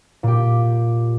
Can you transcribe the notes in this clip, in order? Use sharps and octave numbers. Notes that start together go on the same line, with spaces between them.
A#2 G4